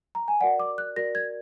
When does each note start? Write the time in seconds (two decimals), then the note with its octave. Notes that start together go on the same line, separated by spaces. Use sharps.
0.15 A#5
0.28 G#5
0.41 F#4 A#4 D5 F#5
0.60 D6
0.78 F#6
0.96 F#4 A#4 D5 A#6
1.15 G#6